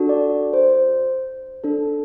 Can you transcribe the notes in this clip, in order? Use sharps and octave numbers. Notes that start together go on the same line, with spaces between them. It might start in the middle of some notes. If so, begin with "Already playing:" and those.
Already playing: D4 F#4 A4
D5
C5
D4 A4